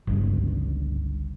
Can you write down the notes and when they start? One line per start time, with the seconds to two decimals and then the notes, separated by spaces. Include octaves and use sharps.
0.07 G1 C#2 G2